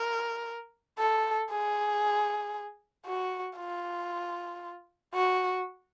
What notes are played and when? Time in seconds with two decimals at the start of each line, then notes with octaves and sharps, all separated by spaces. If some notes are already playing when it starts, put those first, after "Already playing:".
Already playing: A#4
0.99 A4
1.50 G#4
3.06 F#4
3.58 F4
5.14 F#4